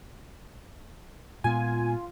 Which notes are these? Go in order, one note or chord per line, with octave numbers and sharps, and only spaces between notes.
A#2 G#3 B3 F4 G#5